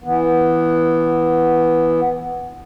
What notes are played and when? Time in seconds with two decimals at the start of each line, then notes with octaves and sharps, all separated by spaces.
0.04 E3 B3